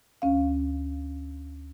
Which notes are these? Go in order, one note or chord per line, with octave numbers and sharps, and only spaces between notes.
D2 C#4 F5